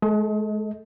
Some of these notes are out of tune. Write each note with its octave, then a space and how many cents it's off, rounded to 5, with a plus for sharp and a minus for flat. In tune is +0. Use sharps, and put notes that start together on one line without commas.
G#3 +35 A4 +0 D#5 +35